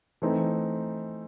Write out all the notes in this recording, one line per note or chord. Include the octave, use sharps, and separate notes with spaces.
E3 A3 C4 D#4